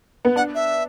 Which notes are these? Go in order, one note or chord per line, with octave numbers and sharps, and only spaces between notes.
B3
D4 F#5
E5